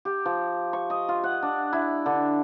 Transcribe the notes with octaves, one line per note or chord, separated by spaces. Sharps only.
G4
F3
C#6
D#5
F4
F#5
D4
E4
D3